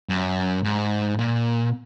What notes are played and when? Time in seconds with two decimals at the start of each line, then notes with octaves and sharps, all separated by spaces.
0.09 F#2
0.64 G#2
1.19 A#2